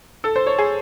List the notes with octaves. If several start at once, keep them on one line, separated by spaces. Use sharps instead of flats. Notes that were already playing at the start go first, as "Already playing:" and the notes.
A4
C5
C#5
G#4